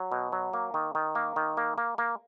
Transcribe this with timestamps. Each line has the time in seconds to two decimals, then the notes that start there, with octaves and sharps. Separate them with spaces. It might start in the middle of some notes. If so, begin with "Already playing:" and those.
Already playing: F#3
0.12 B2
0.32 F#3
0.53 A#3
0.74 D#3
0.95 D#3
1.15 A#3
1.36 D#3
1.57 A#3
1.78 A#3
1.98 A#3